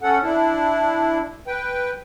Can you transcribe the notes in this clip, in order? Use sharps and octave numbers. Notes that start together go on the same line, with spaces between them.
C#4 A4 F#5
D4 E4
B4 G5